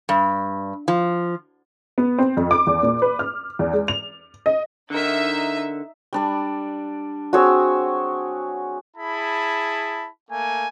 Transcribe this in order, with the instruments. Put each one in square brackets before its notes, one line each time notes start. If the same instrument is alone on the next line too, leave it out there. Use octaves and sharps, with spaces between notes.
[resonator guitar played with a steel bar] G2
F3
[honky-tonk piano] B3
C4
F2
D6
E2
A#2
B4
F6
E2
G#3
F7
D#5
[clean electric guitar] D3 A#4 [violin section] D#4 E5
[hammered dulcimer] G3 D4 D5
[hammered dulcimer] C4 G#4 [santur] F#4 C#5 E6
[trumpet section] E4 G#4 A5 B5
A3 A#3 G#5